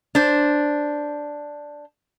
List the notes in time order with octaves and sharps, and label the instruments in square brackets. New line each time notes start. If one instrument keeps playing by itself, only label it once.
[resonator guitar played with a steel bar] D4 C5